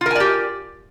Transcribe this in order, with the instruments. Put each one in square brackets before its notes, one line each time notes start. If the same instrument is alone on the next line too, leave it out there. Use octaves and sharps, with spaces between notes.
[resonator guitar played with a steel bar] F4
A#4
G#5
D5
G4